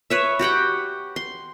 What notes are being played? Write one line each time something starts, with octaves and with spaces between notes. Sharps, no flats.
B4 C#5 E5
F#4 G4 F#5 G5
C6